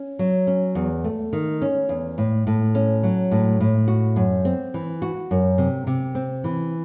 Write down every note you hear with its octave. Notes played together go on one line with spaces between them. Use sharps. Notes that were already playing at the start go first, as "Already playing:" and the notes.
Already playing: C#4
F#3
C#4
E2
A3
D#3
C#4
E2
A2
A2
C#4
F#3
A2
A2
F#4
F#2
C4
E3
F#4
F#2
C3
C3
C4
E3